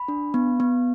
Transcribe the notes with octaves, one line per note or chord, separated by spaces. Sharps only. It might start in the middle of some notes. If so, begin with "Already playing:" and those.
Already playing: B5
D4
B3
B3